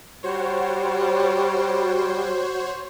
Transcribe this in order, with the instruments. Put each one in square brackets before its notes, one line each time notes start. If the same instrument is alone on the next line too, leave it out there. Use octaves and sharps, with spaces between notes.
[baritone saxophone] G3 [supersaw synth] F#4 C5 C#5